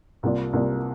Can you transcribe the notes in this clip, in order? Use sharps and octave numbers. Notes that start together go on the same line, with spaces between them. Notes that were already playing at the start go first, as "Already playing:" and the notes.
C2 C3 A#3 F4 D5
C2 C3 A#3 F4 D5